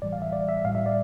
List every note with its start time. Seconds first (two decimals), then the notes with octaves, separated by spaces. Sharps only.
0.02 A2 E3 G3 D5
0.13 F5
0.22 E5
0.33 D5
0.49 E5
0.64 A2 G3 F5
0.75 E5
0.86 D5